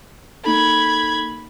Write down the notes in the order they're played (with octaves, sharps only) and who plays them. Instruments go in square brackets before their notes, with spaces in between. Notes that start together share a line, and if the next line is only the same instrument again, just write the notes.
[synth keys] A#3 D#4 A4 [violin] B5 G#6